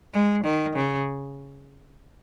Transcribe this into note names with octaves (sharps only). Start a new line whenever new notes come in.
G#3
D#3
C#3